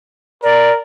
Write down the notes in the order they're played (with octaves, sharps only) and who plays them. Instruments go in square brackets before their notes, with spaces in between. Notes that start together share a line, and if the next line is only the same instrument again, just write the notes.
[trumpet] A#4 [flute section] D5